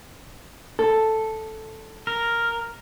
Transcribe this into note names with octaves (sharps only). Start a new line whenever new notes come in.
A4
A#4